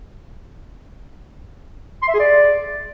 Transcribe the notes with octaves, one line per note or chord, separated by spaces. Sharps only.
C6
E5
G#4
D5